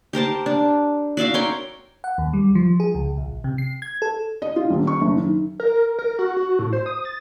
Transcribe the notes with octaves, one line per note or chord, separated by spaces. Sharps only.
G4 A#4 C5 A5
D4
F#4 D5 E5 F5
A#4 C#5 G5 C6
F#5
D#2
G3
F3
G#4
C#2
A#1
C3
C7
G#6
A4
D#5
F4
D#1
C#6
F#1
D#3
A#4
A#4
F#4
F#4
A2
C5
D#6
A6